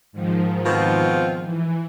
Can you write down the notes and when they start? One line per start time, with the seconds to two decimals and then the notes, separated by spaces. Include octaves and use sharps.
0.12 G#2 D#3 F3
0.65 B2 C4 F4
1.45 E3